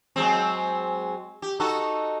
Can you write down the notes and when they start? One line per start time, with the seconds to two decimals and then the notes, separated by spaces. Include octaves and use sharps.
0.16 F#3 G#3 C4
1.42 G4
1.60 D#4 F#4 A4